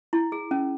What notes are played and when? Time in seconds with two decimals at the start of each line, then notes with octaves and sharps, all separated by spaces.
0.13 E4
0.32 G#4
0.51 C#4